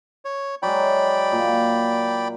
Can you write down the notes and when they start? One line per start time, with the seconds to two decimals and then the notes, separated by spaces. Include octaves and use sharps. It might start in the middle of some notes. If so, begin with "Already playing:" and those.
0.25 C#5
0.63 F#3 G#3 D5 G5 B5
1.32 A#2